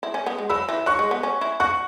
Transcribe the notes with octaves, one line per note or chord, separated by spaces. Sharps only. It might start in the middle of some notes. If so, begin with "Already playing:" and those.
E4
C#4
B3
G#3
F#3 B5 E6
E3
F#3 C#6 F#6
G#3
B3
C#4
E4
F#4 C#6 F#6